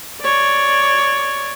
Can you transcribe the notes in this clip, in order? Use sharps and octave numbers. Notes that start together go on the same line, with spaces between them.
C#5 D5